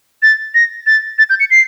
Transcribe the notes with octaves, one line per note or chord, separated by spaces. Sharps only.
A6
A#6
A6
A6
G6
C#7
C7